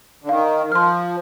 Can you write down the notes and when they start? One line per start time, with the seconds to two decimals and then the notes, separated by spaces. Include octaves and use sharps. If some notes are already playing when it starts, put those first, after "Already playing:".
0.24 D3
0.29 D#3 F5
0.66 D#3
0.71 F3 C6 F6